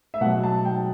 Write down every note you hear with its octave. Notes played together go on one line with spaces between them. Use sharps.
E5
B2 F#3 F#5
A5
G5